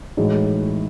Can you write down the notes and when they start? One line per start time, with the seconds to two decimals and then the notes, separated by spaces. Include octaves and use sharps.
0.17 A2 E3 G#3 D#4 F#4